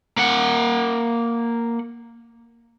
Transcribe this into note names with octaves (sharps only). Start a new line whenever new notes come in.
A#3 F#5